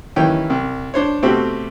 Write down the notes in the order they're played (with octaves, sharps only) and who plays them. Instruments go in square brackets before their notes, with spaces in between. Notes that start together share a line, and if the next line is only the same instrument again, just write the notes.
[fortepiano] D#2 E3 C#4 G5
C2
D4 C5 C#5
B2 A3 C4 F#4 G4